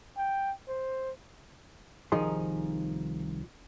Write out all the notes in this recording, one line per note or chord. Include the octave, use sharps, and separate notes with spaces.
G5
C5
C2 D#3 F3 D#4 G#4 C6